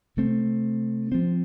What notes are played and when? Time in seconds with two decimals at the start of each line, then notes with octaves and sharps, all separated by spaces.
0.17 C3 A3 C4
1.12 F3 C4